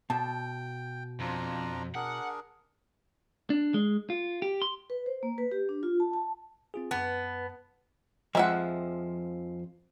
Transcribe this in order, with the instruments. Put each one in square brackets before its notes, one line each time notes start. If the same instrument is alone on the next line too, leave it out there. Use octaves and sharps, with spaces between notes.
[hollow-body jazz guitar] B2 [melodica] G5 [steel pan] A5
[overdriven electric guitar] F2 [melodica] D4 F4 A#5
[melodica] D4 G#4 A#4 [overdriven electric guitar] F#5
[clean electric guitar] D4
G#3
F4
G4
C6
[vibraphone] B4
C5
A#3
B4
G4
D4
F4
A5
A5
[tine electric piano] C4 F4 G#4
[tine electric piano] F#2 B4 A5 [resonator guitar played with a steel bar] B3
[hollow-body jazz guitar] F2 F3 [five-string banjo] G#3 E5 F#5